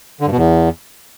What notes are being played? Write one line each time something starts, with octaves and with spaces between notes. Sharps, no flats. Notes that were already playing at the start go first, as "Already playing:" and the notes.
D3
G2
B2
E2